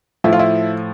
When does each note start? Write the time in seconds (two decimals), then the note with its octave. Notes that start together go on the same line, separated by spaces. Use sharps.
0.24 A2 F3 E4
0.33 F4
0.39 E4